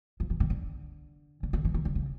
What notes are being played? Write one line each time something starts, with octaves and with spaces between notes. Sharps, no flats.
F3
E3
D#3
D3
D3
D3
E3
D#3
D3
C#3